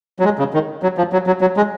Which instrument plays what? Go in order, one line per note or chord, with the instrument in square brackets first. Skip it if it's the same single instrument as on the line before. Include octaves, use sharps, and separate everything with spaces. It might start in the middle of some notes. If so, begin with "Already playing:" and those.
[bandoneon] F#3
G#3
C#3
D#3
F#3
F3
F#3
F#3
F#3
G#3